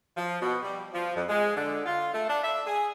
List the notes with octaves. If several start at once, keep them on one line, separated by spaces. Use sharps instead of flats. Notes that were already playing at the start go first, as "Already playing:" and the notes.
F3
B2
G3
F3
F2
G#3
D3
F4
A3
D4
E5
G#4